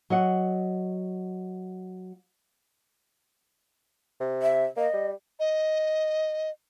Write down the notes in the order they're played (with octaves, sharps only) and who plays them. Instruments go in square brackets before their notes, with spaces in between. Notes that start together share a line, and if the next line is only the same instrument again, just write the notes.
[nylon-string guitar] F#3 D#5 F#5
[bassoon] C3
[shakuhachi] E5
[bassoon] A#3 [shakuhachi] D#5
[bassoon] G3
[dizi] D#5